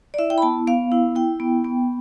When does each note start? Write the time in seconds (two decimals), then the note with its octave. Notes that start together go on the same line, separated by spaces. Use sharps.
0.14 D5
0.18 E4 E5
0.30 G5
0.38 B5
0.42 B3 A5
0.67 B3 F5
0.92 E4
1.15 E4 G5
1.40 B3
1.64 B3